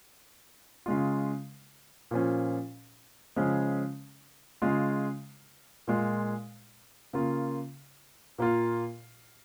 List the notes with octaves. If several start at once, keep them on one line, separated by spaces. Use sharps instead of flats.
C#3 G#3 F4
A#2 F3 C#4
C#3 F3 G#3 C#4
C#3 G#3 F4
A#2 G#3 F4
C#3 A#3 F4
A#2 A#3 F4